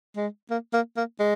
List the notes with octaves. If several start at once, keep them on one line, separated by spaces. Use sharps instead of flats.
G#3
A#3
A#3
A#3
G#3